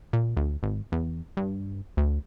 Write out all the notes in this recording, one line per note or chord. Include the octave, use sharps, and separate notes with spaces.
A#2
D2
G#1
E2
G2
D2